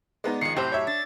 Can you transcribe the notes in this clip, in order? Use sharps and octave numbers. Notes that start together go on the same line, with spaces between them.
G#3 B3 D#4 D5
D#3 F3 G#3 C7 C#7
A2 C3 F#3 G4 C5 G6
C#5 E5
D4 A6